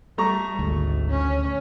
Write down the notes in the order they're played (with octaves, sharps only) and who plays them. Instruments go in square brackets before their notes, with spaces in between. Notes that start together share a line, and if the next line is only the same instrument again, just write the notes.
[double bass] G3 [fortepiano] A3 A#5 C#6
[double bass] G#1 [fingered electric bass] D2
[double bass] C#4